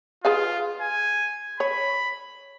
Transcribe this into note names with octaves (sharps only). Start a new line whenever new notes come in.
F4 G#4 B4 F5
G#5
C#5 B5